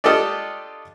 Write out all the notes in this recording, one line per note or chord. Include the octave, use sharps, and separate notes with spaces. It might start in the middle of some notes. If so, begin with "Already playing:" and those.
D4 F4 G4 A4 D#5